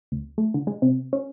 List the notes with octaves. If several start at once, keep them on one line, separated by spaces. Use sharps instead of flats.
D2
A3
D3
G#3
C3
C#4